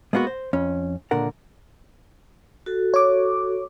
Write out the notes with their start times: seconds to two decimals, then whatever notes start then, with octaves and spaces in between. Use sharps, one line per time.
0.13 G#3 A#3 B3 D4 F#4
0.27 C5
0.53 F2 C#4
1.11 C#2 A#2 D3 A#4 F#5
2.66 F#4 A4
2.94 C#5 D6